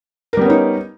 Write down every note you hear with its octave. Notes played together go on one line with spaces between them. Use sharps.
G3 B3 C#4 D#4 A#4